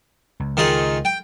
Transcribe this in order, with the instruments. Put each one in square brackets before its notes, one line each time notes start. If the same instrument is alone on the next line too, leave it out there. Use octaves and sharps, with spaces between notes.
[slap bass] C#2
[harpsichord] D#3 F4 G#4
G5